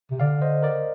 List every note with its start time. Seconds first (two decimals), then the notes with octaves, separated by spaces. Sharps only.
0.11 C3
0.20 D3 D5 F5
0.42 C5 D#5
0.63 A#4 D5